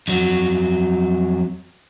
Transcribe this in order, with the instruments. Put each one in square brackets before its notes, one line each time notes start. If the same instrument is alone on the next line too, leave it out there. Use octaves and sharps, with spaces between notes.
[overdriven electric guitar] F2 F#3